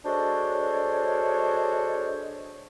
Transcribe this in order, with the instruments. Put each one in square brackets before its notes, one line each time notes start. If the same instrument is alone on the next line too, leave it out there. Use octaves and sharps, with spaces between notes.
[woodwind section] G#3 D4 F#4 A4 C5 C#5